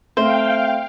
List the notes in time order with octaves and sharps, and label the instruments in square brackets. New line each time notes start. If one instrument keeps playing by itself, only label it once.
[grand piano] A3 C4 [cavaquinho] C5 [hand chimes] E5 [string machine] F5 G5